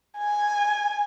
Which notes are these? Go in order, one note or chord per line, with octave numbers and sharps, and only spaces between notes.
G#5